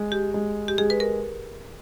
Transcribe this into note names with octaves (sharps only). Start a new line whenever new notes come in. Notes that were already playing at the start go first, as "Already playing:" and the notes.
Already playing: G#3
G4
G#3
G4
G#3 G#4
B4
A#4